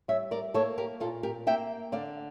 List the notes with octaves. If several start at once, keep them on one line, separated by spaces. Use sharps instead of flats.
G3 C#5 E5
A#4 D5
A#3 A4 C#5
G4 A#4
A#2 F4 A4
G4 A#4
A#3 E5 G5
D3 D5 F5